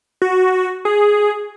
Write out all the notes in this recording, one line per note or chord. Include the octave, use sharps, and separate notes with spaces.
F#4
G#4